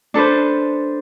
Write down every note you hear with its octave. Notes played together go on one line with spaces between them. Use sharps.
D4 A4 B4 C5